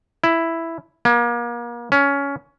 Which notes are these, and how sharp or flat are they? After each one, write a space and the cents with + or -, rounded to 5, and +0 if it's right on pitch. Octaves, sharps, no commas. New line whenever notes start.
E4 +5
A#3 +35
C#4 +15